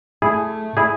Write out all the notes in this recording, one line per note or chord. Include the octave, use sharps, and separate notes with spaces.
A3 E4 G#4
E4 G#4